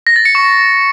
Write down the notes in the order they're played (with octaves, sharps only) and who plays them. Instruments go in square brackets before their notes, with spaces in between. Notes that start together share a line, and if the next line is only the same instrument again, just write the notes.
[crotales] A#6
A6
C#7
C#6